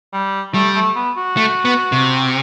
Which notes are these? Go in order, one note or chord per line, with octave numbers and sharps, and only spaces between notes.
G3
G3 A3
A3
B3
F#4
A3
B3
C3